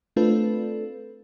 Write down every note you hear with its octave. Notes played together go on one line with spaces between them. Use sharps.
A3 C4 D4 F4 A4 B4